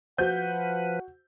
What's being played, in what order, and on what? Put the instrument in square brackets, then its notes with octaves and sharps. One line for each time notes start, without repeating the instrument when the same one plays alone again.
[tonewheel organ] F3 B4 [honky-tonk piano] F#4 G6 [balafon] C5 [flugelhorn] F#5